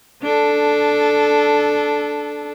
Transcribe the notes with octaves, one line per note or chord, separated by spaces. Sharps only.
D4 A4